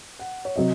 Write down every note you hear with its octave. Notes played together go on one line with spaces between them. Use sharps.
F#5
C#5
C3 F#3 D#5